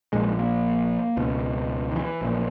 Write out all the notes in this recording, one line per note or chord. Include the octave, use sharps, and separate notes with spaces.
A#1 A#2 G#3
A#3
C#2 B2
D#3
E3
A#1 A#2